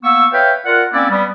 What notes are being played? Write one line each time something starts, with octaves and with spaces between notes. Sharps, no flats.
A#3 B3 C#6 E6
B4 C#5 E5 F5 G5
F4 A#4 D5 F#5
A#3 C4 C#4 E4 D5
G3 B3